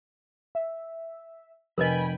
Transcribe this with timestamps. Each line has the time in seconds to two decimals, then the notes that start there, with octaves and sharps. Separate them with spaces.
0.55 E5
1.78 F1 A#4 B4 D#5 G5 G#5 B5